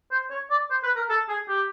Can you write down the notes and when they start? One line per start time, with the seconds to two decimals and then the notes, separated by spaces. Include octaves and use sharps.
0.11 C5
0.31 C#5
0.50 D5
0.70 C5
0.83 B4
0.96 A#4
1.09 A4
1.29 G#4
1.49 G4